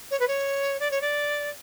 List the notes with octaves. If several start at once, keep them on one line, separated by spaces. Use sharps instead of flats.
C#5
B4
C#5
D5
C#5
D5